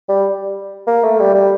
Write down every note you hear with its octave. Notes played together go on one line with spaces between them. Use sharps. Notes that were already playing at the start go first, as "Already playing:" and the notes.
G3
A#3
A3
G3
G3